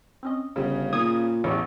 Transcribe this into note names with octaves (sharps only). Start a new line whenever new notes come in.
C4 C#4 D#5
G1 C#3
A#2 D#3 D#6 G#6
A1 E2 G4 C#5